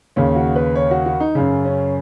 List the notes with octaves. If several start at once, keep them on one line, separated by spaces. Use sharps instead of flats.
D#2 C#3 C#4
F#4
B4
C#5
F#4
F#4
D#4
F#2 C#3
C#4